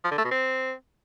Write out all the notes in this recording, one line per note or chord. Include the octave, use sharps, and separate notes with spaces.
F3
D3
A3
B2
C4